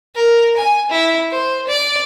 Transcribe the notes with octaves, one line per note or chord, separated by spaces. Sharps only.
A#4
G#5
E4
C5
D5